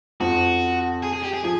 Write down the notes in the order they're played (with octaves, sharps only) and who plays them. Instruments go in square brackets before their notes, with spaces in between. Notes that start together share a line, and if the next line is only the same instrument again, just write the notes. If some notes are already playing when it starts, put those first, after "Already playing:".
[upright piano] F2 F3 [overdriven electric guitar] F#4
[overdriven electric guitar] G#4
G#4
G4
G#4
[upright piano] F3 [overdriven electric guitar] G#4